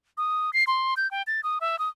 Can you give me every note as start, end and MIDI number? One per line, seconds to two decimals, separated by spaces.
0.17 0.53 87
0.53 0.64 96
0.67 0.94 84
0.97 1.10 91
1.11 1.22 79
1.27 1.41 93
1.43 1.58 87
1.60 1.78 76
1.79 1.89 87